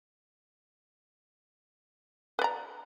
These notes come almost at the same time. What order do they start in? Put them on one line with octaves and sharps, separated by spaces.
B4 D5 A#5